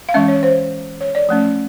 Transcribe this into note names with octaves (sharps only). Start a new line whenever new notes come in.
F5
E3 G#3 C#4 E5
C#5
C5
C#5
D5
F3 A3 C#4